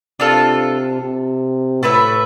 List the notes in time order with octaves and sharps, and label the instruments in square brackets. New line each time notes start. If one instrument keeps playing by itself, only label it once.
[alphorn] C3 [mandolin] D4 F4 A4
[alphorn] C3
[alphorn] A2 [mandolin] A3 E4 B4 E5